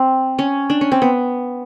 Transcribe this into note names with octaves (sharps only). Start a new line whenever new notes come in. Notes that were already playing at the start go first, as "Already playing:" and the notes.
Already playing: C4
C#4
D4
C#4
C4
B3